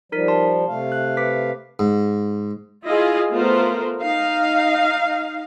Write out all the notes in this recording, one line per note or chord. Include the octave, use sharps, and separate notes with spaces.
F3 G3 D#4 A#4 B6
A5 C6
C3 A3 F5
F#6
B4 D6 B6
G#2
E4 F4 G#4 D#5 F5
A3 B3 F4 A#4 C5
D#4 F5